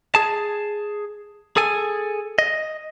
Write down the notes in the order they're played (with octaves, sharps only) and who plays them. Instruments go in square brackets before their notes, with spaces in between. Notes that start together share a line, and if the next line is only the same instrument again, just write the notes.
[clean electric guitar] G#4 A5
G#4 A4 G#5
D#5